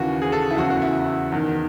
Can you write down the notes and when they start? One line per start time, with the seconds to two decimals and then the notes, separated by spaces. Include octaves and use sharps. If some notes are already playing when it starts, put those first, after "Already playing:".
Already playing: D#2 C#3 E3 F#4
0.22 G#4
0.32 A4
0.50 E4
0.57 E2 C#3 E3 F#4
0.70 F#4
0.82 E4
1.32 E2 D#3